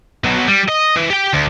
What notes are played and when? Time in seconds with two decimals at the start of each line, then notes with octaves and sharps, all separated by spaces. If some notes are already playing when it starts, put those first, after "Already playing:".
0.24 B2 F#3
0.48 G3
0.69 D#5
0.96 E3
1.10 G4 G5
1.33 D2